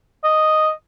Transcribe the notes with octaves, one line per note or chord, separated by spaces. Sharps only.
D#5